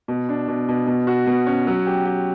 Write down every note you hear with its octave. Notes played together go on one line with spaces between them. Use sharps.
B2
D4
B2
B2
B2
F#4
B2
C#4
F#3
G4
G4